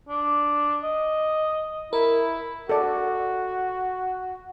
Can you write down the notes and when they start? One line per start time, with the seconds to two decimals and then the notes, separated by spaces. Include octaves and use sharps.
0.09 D4
0.83 D#5
1.93 E4 A#4
2.69 F#4 A4 D5